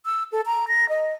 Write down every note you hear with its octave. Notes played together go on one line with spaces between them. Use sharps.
E6
A4
A#5
A#6
D#5